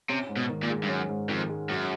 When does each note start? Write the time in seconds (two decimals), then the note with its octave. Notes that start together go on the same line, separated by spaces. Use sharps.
0.09 C3 C#4
0.29 G#2
0.37 B2
0.49 D#3
0.63 A#2
0.69 G#3
0.83 G2
0.89 F#2 C#4
1.09 G#2
1.29 F2 D#3
1.49 G#3
1.69 F#2 F#3